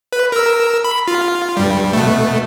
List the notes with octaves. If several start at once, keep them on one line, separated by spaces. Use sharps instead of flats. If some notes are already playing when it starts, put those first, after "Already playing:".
B4
A#4 E6
B5
F4
G2 G3
B2 A3